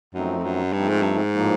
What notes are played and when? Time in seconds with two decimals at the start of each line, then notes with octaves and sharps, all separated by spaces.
0.14 F#2 F3 A3 C4 D#4
0.38 F2
0.44 F#2
0.73 G2 F3 A3 C4 D#4
0.89 G#2
1.02 G2
1.18 G#2
1.33 A2 F3 A#3 D#4